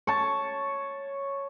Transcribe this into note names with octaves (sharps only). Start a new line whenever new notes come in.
C#5 A5